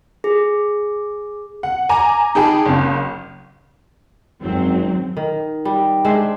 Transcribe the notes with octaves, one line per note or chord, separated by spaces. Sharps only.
G#4
F#5
G#5 A#5 D6
D#4 G#4 G5 A5 B5
F#1 C#3
G#1 F#2 F#3 C4
D#3
G3
G#3 D4 C5 E5